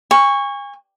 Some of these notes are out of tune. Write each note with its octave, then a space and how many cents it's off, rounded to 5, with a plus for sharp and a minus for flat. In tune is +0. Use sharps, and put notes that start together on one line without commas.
G#5 -35 C#6 +0